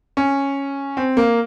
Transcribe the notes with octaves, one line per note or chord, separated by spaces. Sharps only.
C#4
C4
A#3